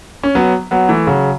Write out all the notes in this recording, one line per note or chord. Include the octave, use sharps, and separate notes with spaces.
C#4
F#3 B3
F#3 B3
E3 A3
C#3 F#3